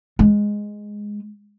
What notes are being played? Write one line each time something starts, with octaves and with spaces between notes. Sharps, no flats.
G#3